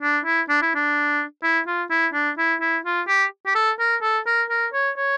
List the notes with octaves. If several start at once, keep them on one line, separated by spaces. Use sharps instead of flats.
D4
E4
D4
E4
D4
E4
F4
E4
D4
E4
E4
F4
G4
G4
A4
A#4
A4
A#4
A#4
C#5
C#5